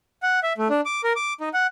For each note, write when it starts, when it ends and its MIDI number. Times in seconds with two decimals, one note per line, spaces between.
0.23 0.40 78
0.43 0.53 76
0.58 0.68 57
0.70 0.81 62
0.86 1.01 86
1.04 1.13 70
1.16 1.34 86
1.41 1.49 63
1.54 1.67 78